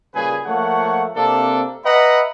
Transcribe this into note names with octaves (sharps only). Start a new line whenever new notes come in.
A#2 C#3 G3 G#4 B4 G#5
F3 A3 A#3 C#5 F#5
C3 A#3 C4 D4 A4
B4 D#5 E5 F#5 A#5 B5